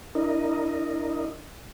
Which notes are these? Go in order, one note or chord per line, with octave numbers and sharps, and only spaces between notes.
D4 E4 A#4 D#5